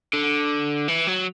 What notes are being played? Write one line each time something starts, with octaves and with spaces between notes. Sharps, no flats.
D3
E3
F#3